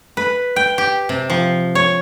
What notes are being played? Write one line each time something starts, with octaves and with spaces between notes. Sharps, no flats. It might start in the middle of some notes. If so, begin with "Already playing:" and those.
B4
G5
G4
C3
F3
C#5